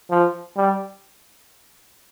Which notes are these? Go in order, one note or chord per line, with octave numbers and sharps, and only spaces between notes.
F3
G3